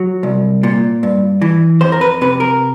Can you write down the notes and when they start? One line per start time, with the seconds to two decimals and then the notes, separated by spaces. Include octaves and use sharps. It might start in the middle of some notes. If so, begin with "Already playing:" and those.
Already playing: F#3
0.23 C2
0.63 A#2
1.03 G2
1.42 E3
1.81 F2 C5
1.92 A#4
2.01 B4
2.21 C3 B4
2.40 A#4